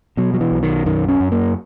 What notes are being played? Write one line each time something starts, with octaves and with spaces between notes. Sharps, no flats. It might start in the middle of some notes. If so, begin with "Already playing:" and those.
B2 F#3
F#3
E3
B1
D#3
F#2 D#3
C#4
F#2
A#3